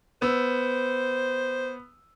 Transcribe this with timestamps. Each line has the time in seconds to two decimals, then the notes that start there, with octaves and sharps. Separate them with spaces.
0.22 B3 C5 E6